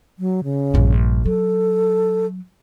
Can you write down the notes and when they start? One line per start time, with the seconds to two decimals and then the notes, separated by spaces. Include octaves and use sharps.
0.19 F#3
0.44 C#3
0.74 A#1 G2
1.26 F#3 A4